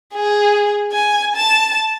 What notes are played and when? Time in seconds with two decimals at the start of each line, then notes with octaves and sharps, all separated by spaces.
0.14 G#4
0.92 G#5
1.36 A5